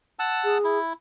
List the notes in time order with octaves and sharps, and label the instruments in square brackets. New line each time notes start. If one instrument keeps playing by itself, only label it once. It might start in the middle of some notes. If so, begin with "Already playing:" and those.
[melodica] F#5 A5 E6
[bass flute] G#4
[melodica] E4